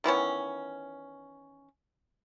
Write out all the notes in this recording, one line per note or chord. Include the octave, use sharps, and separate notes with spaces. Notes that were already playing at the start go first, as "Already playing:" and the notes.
D#3 E3 B3 C#4